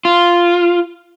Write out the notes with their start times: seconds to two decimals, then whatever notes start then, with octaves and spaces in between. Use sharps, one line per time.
0.05 F4